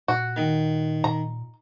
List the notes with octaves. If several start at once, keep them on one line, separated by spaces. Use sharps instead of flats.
A#2 F#4
D#3
A#2 A#5